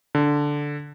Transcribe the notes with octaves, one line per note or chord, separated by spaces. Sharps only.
D3